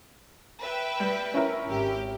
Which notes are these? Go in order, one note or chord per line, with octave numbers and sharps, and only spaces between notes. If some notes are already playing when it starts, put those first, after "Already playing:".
B4 E5 G5
G3
C#4 E4 A#4
G#1 G4